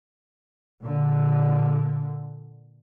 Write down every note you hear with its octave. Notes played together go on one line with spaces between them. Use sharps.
A#2 D3